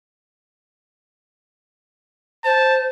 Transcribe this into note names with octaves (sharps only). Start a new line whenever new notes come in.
C5 A5